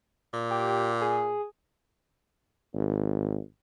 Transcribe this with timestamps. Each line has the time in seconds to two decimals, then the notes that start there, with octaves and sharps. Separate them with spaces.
0.33 A#2
0.51 G4
1.01 G#4
2.74 G#1